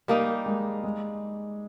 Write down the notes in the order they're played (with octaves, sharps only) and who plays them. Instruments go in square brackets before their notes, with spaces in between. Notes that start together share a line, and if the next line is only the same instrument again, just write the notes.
[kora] G3 A#3 D#4
[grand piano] G#3
G#3